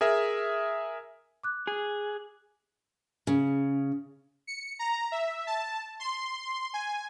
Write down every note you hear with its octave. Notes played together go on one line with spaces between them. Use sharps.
G#4 A#4 E5
D6 F#6
G#4
C#3
C#7
A#5
E5
A5
C6
G#5